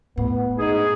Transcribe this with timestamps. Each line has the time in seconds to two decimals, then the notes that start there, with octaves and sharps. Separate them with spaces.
0.17 A2 B3
0.58 D#4 G#4